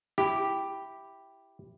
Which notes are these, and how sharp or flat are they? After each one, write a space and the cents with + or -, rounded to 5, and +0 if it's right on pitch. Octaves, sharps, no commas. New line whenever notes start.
E4 +0 G4 +0